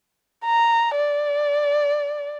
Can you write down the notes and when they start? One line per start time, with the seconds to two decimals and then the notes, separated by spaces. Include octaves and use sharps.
0.45 A#5
0.96 D5